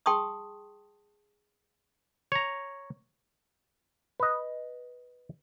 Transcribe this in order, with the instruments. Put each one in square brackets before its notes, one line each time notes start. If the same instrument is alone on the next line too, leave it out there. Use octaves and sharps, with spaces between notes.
[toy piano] G#4 G5 A5 C6 C#6 D#6
[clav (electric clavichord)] C#5 A#5
B4 D#5